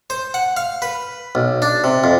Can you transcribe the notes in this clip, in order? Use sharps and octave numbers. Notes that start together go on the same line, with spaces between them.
C5
F#5
F5
B4
B1
D4
C3
F2